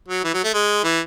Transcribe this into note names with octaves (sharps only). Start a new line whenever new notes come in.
F#3
E3
F#3
A3
G#3
E3